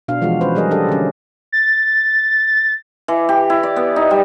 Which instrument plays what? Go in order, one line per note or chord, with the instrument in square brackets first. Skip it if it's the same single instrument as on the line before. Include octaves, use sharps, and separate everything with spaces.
[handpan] B2 D4 F5
E3 F3 G#3 F4 F#4
C#4 B4 C5
F#3 G3 G#4 A#4 D#5
D4 G4 A4 D#5
D3 C#4
[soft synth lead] A6
[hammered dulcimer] E3
G4
E4
D5
B3
D#4
G3